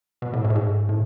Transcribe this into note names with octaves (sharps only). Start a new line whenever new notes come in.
B2
A2
G#2
A2
G#2
A2